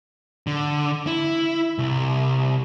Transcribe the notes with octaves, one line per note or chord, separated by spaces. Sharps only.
D3
E4
C2